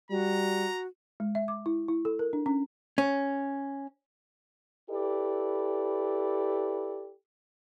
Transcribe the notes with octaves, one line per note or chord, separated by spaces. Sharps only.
G3 F#4 A#5
G#3
E5
D6
E4
E4
A4
A#4
D4
C#4
C#4
E4 G4 A4 B4 D5